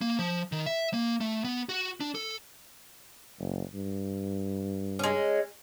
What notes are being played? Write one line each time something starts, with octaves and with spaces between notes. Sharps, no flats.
A#3
F3
D#3
E5
A#3
A3
B3
F#4
D4
A4
F#1
G2
G#3 C#4